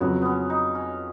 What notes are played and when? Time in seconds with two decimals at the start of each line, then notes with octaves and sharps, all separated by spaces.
0.01 F2 C#3 F#3 B3
0.22 B3 C#4
0.50 D#4
0.75 C#4